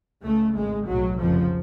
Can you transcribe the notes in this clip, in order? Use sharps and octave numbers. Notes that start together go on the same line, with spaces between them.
C#2 C#3 A3
G#1 G#2 G#3
B1 A2 F#3
F1 F2 C#3 F3